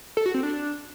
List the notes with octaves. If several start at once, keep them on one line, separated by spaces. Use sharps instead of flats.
A4
F#4
C4
D4